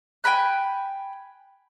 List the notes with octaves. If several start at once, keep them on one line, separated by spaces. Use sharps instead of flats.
G5 G#5 B5 F#6